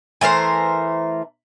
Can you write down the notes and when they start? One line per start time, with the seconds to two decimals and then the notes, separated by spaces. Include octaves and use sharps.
0.21 E3 A3 A#4 C5